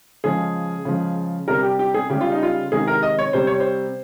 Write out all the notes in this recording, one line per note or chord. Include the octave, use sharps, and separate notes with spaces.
C#3 F3 G#3 G#4
C#3 F3 G#3
C3 G3 A#4
G4
G4
G#4
C#3 G3 G4
F4
D#4
F4
C3 D#3 G#3 G#4
A#4
D#5
C#5
C3 G3 C5
C#5
C5